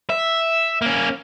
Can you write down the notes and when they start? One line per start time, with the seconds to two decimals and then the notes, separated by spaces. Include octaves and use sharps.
0.10 E5
0.82 A#3 C#4